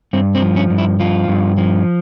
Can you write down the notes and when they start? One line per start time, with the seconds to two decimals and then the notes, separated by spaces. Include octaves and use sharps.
0.13 G2 C4
0.35 C4
0.42 F3
0.56 C#4
0.70 G2
0.78 E4
1.00 F3 F4
1.28 G2
1.58 F3